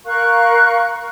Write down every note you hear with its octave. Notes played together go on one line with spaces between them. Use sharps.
A#4 F5 C#6 F#6